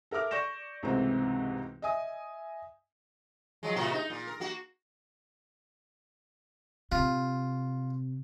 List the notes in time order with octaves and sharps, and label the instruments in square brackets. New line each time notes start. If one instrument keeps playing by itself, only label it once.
[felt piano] A4 A#4 E5 D6 F6
D5 C#6 G6 A#6 E7
C#2 G#2 C3 E3 A3 C4
D#5 E5 G#5 D#6
[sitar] F3 F#3 G#3
A2 C3 F#4
D#4
A#2
A#4
A#3 F#4
[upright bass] C3 [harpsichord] F4